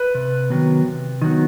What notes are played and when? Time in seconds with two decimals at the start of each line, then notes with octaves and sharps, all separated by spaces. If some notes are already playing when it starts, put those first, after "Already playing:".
Already playing: B4
0.15 C3
0.50 D#3 F#3 B3
0.86 C3
1.22 D#3 F#3 B3